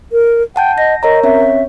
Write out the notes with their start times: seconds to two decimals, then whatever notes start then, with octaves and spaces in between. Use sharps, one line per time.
0.12 A#4
0.56 F#5 G5 A5 G6
0.78 D#5 A#6
1.03 A#4 C#5 D#5 A#5
1.23 C4 C#4 C#5 E5